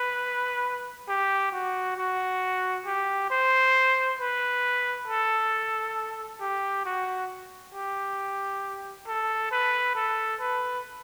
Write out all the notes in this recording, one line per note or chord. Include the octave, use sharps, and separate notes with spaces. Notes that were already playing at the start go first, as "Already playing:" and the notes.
Already playing: B4
G4
F#4
F#4
G4
C5
B4
A4
G4
F#4
G4
A4
B4
A4
B4